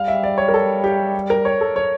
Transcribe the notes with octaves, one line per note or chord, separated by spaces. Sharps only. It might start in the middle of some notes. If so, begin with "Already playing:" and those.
Already playing: G3 F5
E5
D5
C#5
A#4
A4
G4
A#4
C#5
A4
C#5